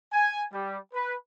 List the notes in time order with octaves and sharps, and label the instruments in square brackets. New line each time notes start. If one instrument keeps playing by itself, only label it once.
[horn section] G#5
G3
B4